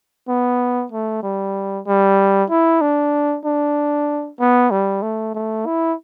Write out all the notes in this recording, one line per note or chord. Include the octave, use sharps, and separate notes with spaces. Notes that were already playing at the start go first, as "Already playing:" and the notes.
B3
A3
G3
G3
E4
D4
D4
B3
G3
A3
A3
E4